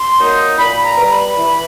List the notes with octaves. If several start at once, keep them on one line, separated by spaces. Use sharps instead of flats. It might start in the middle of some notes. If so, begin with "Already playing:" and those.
Already playing: C6
F#3 A#3 D#4
A#2 B5
A#5
G3 B3
B5
E3